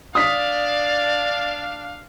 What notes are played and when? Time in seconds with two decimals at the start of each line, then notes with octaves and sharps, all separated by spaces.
0.15 D4 D5 F5 D#6 B6